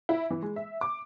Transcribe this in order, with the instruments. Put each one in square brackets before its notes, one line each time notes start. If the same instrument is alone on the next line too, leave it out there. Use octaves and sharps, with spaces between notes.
[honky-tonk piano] E4
E3
G#3
E5
D6